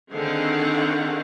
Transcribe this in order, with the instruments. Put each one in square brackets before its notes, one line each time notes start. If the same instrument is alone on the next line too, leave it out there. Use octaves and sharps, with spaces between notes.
[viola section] D3 D#3 C4 G#4 F5 F#5